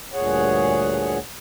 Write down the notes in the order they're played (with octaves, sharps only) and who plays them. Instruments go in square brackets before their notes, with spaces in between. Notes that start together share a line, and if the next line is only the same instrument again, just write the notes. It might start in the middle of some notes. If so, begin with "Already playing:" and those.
[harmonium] D2 G2 A#2 G#4 C#5 F#5